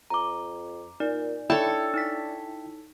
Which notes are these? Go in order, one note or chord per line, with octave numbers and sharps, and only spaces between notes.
F2 A#5 D6
A#2 D#4 D5
D4 E4 A4 C#5 G5 A5
D#4 B6